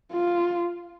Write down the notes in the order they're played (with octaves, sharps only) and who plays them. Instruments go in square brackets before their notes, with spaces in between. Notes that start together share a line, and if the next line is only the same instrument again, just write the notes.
[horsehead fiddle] F4